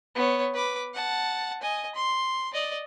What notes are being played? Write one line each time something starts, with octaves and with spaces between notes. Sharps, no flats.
B3 C#5
B4 D6
F#5 A5
D#5 G#5
C6
D5 D#5